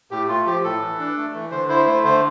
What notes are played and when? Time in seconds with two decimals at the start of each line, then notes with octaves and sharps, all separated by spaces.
0.11 A2 G4
0.29 A3 F4
0.46 F3 G4
0.64 A2 A4
0.81 E3
0.99 D4
1.17 A3
1.34 E3
1.51 D3 C5
1.69 E4 C5
1.86 A3 C5
2.04 D3 C5